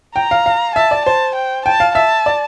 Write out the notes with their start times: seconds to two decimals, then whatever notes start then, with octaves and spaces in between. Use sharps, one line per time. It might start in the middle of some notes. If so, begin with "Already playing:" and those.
0.16 G5 A#5
0.31 F5
0.46 F5
0.76 E5 A5
0.91 D5
1.06 C5 A5
1.35 G5
1.66 G5 A5
1.80 F5
1.95 E5 A5
2.26 D5